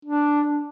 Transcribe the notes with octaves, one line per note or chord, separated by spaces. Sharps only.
D4